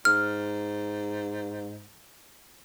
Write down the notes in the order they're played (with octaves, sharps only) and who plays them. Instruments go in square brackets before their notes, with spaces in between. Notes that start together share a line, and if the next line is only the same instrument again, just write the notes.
[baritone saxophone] G#2 [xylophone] F6